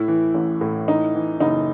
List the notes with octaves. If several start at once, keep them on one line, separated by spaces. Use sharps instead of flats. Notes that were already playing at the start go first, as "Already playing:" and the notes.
Already playing: A2 E4
E3
A1
A2
E3 D#4
E3
F#1 D#4